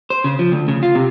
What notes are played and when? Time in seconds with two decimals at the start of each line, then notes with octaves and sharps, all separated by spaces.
0.10 C5
0.24 C#3
0.39 F3
0.52 D2
0.68 C#3
0.83 F4
0.95 C3